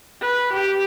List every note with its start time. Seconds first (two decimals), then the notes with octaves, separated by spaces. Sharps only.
0.21 B4
0.53 G4